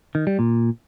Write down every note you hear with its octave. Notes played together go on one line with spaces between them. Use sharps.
D#3
G3
A#2